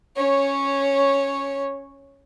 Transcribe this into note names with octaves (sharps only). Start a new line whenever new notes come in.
C#4 C#5